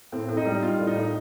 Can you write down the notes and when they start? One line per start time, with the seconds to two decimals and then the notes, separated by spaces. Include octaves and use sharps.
0.12 A2 C4
0.29 A2
0.37 D#4
0.45 G3
0.62 G3 F4
0.78 A2
0.87 D#4
0.96 A2